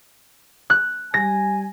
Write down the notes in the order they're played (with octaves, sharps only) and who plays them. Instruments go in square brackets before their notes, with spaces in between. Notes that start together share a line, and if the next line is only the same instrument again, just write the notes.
[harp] F#6
[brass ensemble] G3 G#5 [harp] A#6